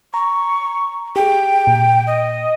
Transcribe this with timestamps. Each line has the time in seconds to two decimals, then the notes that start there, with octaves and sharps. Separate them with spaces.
0.14 A#5 C#6
1.16 G4 G#4 G5
1.67 A#2
2.07 D#5